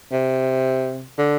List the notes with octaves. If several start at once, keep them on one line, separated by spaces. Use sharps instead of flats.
C3
D3